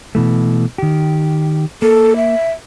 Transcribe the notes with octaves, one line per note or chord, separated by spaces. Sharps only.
B2 E3 A3
D#3 G4
A#3 A4
E5